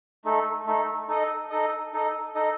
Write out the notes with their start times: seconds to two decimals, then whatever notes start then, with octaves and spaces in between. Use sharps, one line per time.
0.25 A3 D#4 A4
0.66 A3 D#4 A4
1.08 D#4 A4 D#5
1.50 D#4 A4 D#5
1.93 D#4 A4 D#5
2.35 D#4 A4 D#5